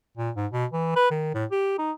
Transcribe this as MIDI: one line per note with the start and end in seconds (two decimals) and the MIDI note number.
0.17 0.30 46
0.36 0.47 44
0.51 0.65 47
0.72 0.95 52
0.96 1.09 71
1.11 1.29 51
1.34 1.45 45
1.51 1.75 67
1.79 1.92 63